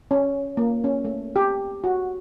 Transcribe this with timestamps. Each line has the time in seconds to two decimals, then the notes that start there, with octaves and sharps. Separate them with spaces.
0.11 C#4
0.57 A#3
0.84 C#4
1.05 A3
1.36 G4
1.84 F#4